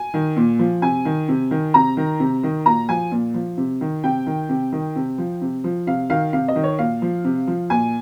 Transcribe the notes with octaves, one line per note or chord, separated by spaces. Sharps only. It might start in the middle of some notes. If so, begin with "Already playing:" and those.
Already playing: G#5
D#3
A#2
F3
C3 G#5
D#3
C3
D#3
C3 A#5
D#3
C3
D#3
A#2 A#5
F3 G#5
A#2
F3
C3
D#3
C3 G5
D#3
C3
D#3
C3
F3
C3
F3
C3 F5
D#3 F5
C3 F5
D#5
D#3
C#5
A#2 F5
F3
C3
F3
A#2 G#5